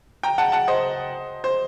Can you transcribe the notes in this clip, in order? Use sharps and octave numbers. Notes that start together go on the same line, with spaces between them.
G5 A#5
F#5 A5
F#5 A5
C5 D#5
C5